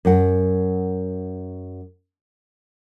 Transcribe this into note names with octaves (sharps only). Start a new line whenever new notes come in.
F#2 F#3 F#5